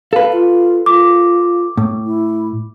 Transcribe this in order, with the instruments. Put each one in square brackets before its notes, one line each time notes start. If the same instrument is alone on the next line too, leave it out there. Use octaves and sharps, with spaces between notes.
[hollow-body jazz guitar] A4 B4 [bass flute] F5
[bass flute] F4
[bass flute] F4 [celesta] D6
[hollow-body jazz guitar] A2
[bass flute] E4